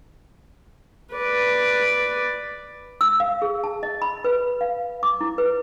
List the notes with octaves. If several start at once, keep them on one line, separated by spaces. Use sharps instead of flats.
B4 D5
E6
F5
G#4
A5
D#5
B5
B4
F5
D6
E4
B4